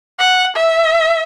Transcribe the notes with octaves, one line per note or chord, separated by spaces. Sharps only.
F#5
E5